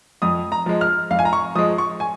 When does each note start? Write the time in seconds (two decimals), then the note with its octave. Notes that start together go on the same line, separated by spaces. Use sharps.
0.22 F2 D#6
0.52 A#5
0.66 F3 G#3
0.81 F6
1.10 F2 F5
1.19 G#5
1.25 A#5
1.33 C#6
1.55 F3 D#6
1.59 G#3
1.78 C#6
2.00 G#5